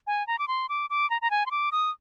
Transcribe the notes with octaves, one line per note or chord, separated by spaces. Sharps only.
G#5
A#5
D6
C6
D6
D6
A#5
A#5
G#5
C6
D6
D#6